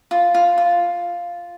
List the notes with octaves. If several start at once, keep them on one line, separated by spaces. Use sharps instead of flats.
F4
F4
F4